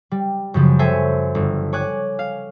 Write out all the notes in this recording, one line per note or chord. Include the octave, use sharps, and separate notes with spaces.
G3
F#2 C#3 F3
A4 C5 C#5 E5 G#5
G1
C#5 G#5 D6 F#6
F5